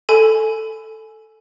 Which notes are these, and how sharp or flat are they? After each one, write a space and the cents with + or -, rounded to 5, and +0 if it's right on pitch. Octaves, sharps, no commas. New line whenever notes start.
A4 +0 G#5 +15 B5 +30